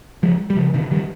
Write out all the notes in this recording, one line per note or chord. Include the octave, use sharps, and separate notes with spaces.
F3 G#3
G3
C#3 F3
C3 D#3
D#3 G3